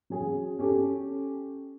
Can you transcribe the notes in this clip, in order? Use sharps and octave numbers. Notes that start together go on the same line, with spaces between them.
F#3 C#4 G#4
C#4 G4 A4